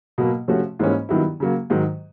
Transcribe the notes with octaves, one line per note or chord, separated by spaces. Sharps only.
B2 F#3 A#3
C3 F3 A3 C#4 F#4
G#2 E3 G3 A#3 C#4
G2 D#3 F#3 B3 E4
C#3 F#3 A#3
G#2 D#3 F#3